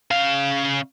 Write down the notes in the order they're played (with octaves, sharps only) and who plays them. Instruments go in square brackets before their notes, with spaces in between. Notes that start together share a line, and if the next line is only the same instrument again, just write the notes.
[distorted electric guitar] C#3 F5